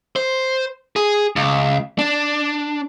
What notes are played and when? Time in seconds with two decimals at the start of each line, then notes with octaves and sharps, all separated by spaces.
0.16 C5
0.96 G#4
1.36 C#2
1.99 D4